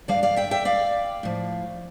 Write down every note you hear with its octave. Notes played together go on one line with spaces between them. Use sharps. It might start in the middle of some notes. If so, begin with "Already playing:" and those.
G2 F3 D5 F5
D5 F5
E5 G5
E5 G5
D5 F5
A2 F3